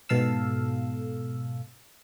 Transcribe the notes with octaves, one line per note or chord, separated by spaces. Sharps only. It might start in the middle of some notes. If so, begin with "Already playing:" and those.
G#2 B2 A4 F5 E6